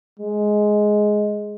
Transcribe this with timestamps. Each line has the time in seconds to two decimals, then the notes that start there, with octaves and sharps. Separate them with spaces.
0.19 G#3